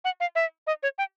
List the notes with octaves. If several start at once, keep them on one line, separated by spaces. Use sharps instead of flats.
F#5
F5
E5
D#5
C#5
G5